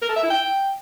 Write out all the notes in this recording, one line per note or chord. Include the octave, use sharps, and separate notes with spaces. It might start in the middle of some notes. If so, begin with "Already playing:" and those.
A#4
A4
E5
E4
G5